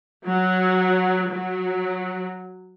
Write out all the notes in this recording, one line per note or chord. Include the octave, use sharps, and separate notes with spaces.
F#3
F#3